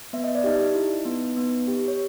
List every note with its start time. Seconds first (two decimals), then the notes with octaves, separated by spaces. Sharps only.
0.13 B3 E5
0.24 D#5
0.35 D5
0.44 D#4 G4 D#5
0.75 E4
1.05 B3
1.37 B3
1.68 G4
1.88 C#5